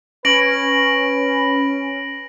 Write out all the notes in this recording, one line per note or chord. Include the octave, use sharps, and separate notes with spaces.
C#4 B4 A#6 D7 F#7